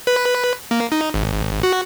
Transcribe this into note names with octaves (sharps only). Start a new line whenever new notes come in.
B4
A#3
D#4
G#1
F#4